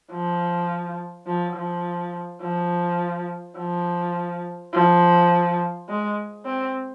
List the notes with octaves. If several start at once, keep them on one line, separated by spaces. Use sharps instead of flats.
F3
F3
F3
F3
F3
F3
G#3
C4